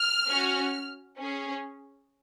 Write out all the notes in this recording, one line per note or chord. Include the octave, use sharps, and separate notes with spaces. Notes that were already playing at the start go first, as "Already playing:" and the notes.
Already playing: F6
C#4 F#4
C#4 G#4